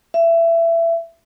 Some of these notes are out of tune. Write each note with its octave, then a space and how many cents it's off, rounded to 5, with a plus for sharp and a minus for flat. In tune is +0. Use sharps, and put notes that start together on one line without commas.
E5 +20